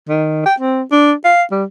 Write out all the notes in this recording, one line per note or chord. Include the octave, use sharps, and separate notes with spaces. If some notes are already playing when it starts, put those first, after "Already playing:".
D#3
G5
C4
D4
F5
G3